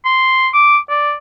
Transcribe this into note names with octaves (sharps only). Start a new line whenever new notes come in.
C6
D6
D5